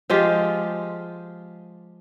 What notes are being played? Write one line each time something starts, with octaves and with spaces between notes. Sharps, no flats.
F3 G#3 F4 G4